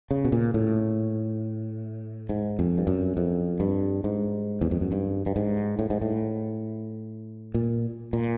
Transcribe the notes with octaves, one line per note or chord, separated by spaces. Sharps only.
C#3
B2
A#2
A2
G#2
F2
G2
F#2
F2
G2
G#2
E2
F2
F#2
G2
G2
G#2
A2
G#2
A2
A#2
A#2